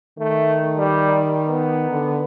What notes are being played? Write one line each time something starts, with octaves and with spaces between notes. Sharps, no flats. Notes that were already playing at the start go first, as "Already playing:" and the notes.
D#3 A3
G3
B3
D3